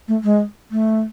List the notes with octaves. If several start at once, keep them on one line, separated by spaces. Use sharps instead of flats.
A3
G#3
A3